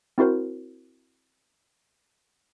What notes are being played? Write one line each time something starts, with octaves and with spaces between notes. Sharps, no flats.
C4 E4 F#4 A#4 C5